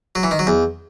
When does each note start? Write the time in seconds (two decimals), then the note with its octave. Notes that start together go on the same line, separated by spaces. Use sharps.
0.15 F#3
0.23 E3
0.31 D#3
0.39 F#3
0.47 E2